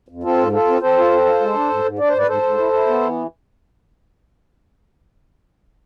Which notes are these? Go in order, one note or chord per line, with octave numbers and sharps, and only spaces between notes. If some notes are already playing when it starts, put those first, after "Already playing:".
F2
C4 F4 A4
G#2
F4 A4
C4
C4 A4 C5
F4
C4
F4
G#3
D4
G#2
G#2
D4 D5
C5
G#2 B4 D5
G#2 A4 C5
G#2
E4
E4
B3
E3